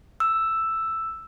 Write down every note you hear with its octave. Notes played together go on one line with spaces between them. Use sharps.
E6